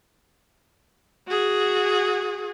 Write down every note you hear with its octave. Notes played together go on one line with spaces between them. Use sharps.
F#4 G#4